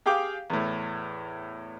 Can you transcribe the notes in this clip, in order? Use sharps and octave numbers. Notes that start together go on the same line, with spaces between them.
G4 G#4 F5 G5 D6
E2 A2